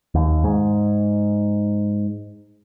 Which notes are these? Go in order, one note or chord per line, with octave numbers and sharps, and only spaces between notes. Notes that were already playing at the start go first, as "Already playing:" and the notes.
D#2
G#2